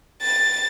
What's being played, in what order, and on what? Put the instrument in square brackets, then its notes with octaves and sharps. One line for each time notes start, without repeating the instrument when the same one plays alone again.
[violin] A6